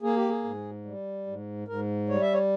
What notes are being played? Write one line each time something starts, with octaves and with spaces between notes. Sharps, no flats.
A#3 G#4
G4
G#4
G#2
G3
G#2
G#2 A#4
G3 C#5
E5
C#5